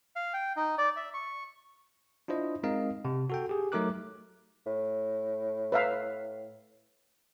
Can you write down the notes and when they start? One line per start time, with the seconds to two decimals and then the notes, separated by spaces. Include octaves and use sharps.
0.16 F5
0.34 G5
0.56 D#4
0.78 D5
0.96 E5
1.14 C#6
2.28 D4 E4 F4 C5 D#5
2.63 G#3 C4 D#4 A#4 D#5 F5
3.05 C3
3.30 F#4 A4 G5
3.49 G4 G#4
3.72 F#3 A3 D#4 A#4 D6 F#6
4.66 A2
5.72 B4 E5 F5